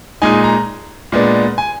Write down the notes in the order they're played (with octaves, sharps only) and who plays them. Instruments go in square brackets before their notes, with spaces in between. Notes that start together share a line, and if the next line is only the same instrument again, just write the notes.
[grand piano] A#2 G#3 D#4 G#5
A#5
A#2 G#3 B3 D4
G#5